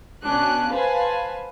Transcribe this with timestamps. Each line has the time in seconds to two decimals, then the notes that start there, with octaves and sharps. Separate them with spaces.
0.24 B2 C#4 D4 F#6
0.73 B4 C5 F5 G#5 A5